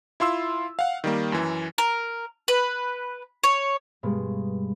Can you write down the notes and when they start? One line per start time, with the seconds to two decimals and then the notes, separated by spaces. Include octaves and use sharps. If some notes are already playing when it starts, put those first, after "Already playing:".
0.20 E4 F4 C6 E6
0.79 F5 F#5
1.04 D#3 G3 A#3
1.32 F#2 E3
1.78 A#4
2.48 B4
3.44 C#5
4.03 G2 B2 G#3